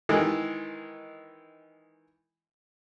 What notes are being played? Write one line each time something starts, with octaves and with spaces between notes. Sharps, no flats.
D#3 E3 G#3